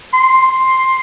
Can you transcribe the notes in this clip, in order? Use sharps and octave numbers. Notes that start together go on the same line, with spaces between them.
C6